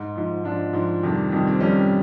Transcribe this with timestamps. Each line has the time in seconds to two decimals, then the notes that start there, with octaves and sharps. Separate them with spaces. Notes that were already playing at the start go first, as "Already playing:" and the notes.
Already playing: G#2
0.16 G#2 F3
0.44 G#2 F3 D4
0.73 G#2 F3
1.03 F2 C3 D#3 G3
1.32 F2 C3 D#3 G3
1.47 C4
1.60 F2 C3 D#3 G3 C#4